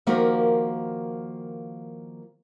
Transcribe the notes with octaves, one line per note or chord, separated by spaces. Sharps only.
D#3 F3 A#3 F#4 G4 A#4